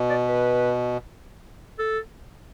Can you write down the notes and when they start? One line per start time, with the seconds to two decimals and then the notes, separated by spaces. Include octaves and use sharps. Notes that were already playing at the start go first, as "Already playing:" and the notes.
Already playing: B2
0.10 D5
0.27 B4
1.79 A4